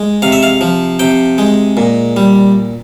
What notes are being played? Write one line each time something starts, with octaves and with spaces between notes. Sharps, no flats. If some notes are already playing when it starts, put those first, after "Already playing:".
Already playing: G#3
C3 F5
E5
F5
F3
C3 G5
G#3
A#2
G3